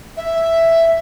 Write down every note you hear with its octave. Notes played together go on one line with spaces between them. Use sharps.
E5